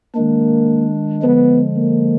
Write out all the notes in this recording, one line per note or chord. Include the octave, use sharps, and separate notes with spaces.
D#3 G#3 A#3 D4
D3 F3 G#3 B3
A#3